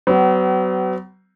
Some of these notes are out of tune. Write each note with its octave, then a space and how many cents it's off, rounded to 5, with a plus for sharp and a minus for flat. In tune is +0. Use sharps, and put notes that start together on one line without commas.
F#3 +35 B3 +40